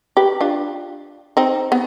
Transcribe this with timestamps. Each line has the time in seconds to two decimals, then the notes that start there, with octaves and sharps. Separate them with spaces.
0.17 G4 B4
0.41 D4 F4
1.37 C4 D#4
1.72 B3